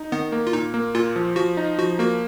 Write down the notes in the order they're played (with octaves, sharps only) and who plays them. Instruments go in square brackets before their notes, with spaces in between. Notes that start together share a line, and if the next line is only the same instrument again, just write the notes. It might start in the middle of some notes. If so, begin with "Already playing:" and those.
Already playing: [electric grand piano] D#4
[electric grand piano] D#3 [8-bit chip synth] B3
[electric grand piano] A#3
[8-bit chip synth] F4
[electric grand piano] A#2 [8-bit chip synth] D#4
[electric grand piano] A#3
[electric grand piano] A#2 [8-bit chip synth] F4
[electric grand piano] F3
[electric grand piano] F3 [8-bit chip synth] F#4
[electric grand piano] D#4
[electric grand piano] F3 [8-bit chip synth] F#4
[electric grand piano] A#3 [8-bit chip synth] F#4